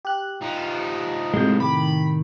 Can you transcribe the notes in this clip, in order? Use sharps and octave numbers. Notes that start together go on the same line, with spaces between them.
G4 F#6
F3 D#4
A2 C3 G#3 G6
D#3 B5 D6